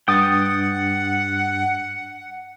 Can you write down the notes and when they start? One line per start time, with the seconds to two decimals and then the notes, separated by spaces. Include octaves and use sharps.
0.08 G2 F#5 G5 D#6 A6